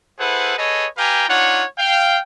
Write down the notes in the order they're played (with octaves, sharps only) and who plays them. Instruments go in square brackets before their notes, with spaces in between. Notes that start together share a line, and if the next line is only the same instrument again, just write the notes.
[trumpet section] E4 G#4 A4 B4 C5 F#5
G#4 A4 B4 C#5 D#5
G4 B4 F5 G5 G#5 A#5
D4 D#4 F4 C#5 F#5
F5 G5